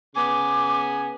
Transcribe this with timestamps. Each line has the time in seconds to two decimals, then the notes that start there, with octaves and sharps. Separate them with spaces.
0.15 C#3 B3 G#5 D6